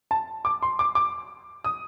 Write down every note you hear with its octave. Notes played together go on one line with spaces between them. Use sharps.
A5
D6
C6
D6
D6
D#6